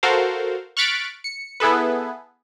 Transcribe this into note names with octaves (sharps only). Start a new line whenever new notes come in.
F#4 A4 A#4 C5 F5
C#6 F6 F#6 A6 B6 D7
C#7
B3 E4 G#4 A4 B4